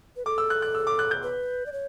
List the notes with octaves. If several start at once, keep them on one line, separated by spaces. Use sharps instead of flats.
B4
A4 D6
E6
F#6
F#6
E6
D6
F#6
G6
B4
D5
C#5